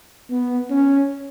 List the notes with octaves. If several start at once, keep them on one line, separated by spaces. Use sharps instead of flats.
B3
C#4